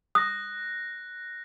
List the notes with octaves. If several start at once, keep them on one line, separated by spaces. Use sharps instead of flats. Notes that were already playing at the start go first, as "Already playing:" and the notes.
D#6 F#6 A#6